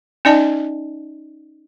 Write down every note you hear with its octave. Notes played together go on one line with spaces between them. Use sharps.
C#4 D#4 D5 D#5 A5